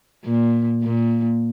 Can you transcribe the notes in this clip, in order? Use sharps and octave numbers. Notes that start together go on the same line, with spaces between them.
A#2
A#2